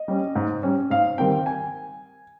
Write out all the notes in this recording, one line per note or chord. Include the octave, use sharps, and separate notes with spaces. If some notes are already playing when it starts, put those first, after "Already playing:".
Already playing: D#5
G3 C#4
G#2
G3 C#4
G#2 F5
D#3 G3 C4 G5
G#5